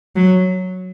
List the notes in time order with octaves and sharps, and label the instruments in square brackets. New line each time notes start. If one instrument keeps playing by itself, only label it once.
[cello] F#3